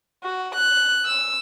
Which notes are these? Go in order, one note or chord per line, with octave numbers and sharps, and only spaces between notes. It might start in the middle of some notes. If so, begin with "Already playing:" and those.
F#4
F#6
E6